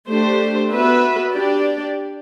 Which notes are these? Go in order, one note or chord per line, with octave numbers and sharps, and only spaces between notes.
A3 D4 G4 C5
B3 F#4 B4 E5
D4 G4 D5